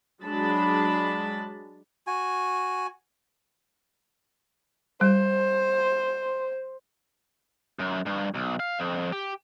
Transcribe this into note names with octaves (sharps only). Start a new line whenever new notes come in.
F#3 G#3 D4 A5 B5
F#4 G#5
G3 C5
F#2
G2
B1
F5
F2
G4